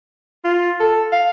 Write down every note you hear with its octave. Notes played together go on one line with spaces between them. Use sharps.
F4
A4
F5